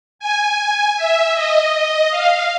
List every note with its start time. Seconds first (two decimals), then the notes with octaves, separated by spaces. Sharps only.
0.19 G#5
0.97 E5
1.34 D#5
1.73 D#5
2.10 F5